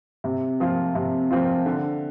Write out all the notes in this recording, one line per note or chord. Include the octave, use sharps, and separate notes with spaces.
C3
F3 C4 F4
C3
F3 C4 F4
D3